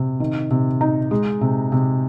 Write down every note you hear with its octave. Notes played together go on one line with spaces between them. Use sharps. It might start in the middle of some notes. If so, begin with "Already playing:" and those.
Already playing: C3
D#3
C3
D#4
G#3
C3
C3